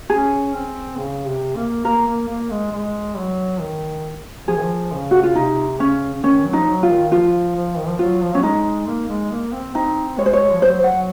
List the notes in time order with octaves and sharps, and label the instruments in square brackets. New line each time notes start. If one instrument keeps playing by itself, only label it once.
[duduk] C#4 [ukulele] G#4
[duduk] C4
C#3
C3
A#3
[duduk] A#3 [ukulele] A#4
[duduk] A#3
A#3
G#3
G#3
F#3
D#3
[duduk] F3 [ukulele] G#4
[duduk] D#3
F3
C#3
[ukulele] F#4
F4
[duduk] C3 [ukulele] D#4
[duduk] C#3 [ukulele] C#4
[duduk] D#3 [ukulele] C#4
[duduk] F#3
[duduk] F3 [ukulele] D#4
[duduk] F#3
[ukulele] F4
[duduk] D#3
[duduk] F3 [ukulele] F4
[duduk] F3
D#3
F3
[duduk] F#3 [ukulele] F4
[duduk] F3
[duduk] F#3 [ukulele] C#4
[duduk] G#3 [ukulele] D#4
[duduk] A#3
G#3
A#3
C4
[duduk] C4 [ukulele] D#4
[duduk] G#3 [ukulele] C#5
[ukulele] C5
C#5
[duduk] F3
[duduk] F#3 [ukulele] C5
[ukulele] F#5
[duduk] F#3